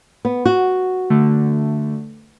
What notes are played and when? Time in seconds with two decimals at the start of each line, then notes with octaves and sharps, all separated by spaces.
0.25 B3
0.45 F#4
1.10 D3 A3